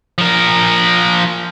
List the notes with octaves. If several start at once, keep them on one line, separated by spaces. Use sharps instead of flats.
F3 A#4